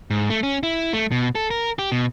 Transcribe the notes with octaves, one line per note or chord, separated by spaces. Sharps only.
G#2
A3
C#4
E4
A3
B2
A4
A#4
G4
B2